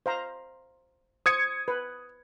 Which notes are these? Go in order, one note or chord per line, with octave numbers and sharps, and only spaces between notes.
C5 F5 A#5
C5 D#6 G#6 C#7
B4